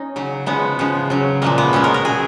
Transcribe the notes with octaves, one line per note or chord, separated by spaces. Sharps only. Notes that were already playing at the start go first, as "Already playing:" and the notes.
Already playing: C#4 D#4
C#3 F#3
C#3 F3 G#3 B3
C#3 F3 G#3
C#3 F#3
A#2 F3 G#3 A#3
B3
B2 G#3 C#4
A#4
A#4
B2 F#3 G#4